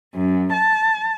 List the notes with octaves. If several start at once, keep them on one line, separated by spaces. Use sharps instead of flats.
F#2
A5